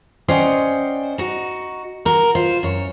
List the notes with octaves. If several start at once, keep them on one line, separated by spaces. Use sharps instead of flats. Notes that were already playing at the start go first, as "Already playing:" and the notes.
C#4 C5 D5 D#5 F#5 G5
D#4 F#4
F#4 A#4
F4 C5
F#2 C#5